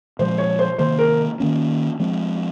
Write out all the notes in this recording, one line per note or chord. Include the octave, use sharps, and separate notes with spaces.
A#2 F3 G#3 C5
C#5
C5
C3 D#3 A#3 C5
A#4
D#3 A#3 C#4
F3 G#3 C4